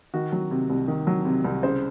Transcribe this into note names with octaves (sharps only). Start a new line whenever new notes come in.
D#3 F#4
F#3
C3
C2
D#3
F#3
C3
C2
C#3 C5